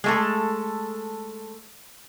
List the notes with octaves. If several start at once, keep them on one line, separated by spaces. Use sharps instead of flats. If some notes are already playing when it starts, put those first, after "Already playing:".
G#3 A3 A4